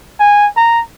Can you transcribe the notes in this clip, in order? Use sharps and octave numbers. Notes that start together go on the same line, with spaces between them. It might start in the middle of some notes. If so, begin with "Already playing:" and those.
G#5
A#5